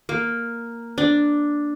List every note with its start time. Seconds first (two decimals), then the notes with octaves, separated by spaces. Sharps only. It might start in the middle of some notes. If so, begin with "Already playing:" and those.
0.09 A#3
0.98 D4